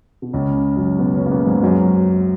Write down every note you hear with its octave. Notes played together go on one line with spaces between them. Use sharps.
B2
C#2 C#3
F#2 F#3
B2 B3
C#3 C#4
A#3
B2 B3
G#2 G#3
F#2 F#3